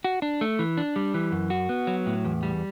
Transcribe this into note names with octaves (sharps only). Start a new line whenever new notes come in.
F#4
D4
A3
E3
D4
G3
E3
F#2
F#4
B3
F#3
A2
E2
G3